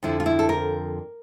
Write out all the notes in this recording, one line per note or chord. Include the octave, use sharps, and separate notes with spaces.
F2 D3 F3 E4
F4
E4
A4
A#4